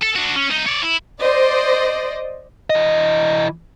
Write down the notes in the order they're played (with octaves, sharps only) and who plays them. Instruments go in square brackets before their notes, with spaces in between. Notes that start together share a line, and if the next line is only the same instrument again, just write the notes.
[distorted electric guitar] A4
D4 F#4
C#4
C2 D#4
C#5 D5
E4
[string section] C5 D5 D#5
[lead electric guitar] E3 D#5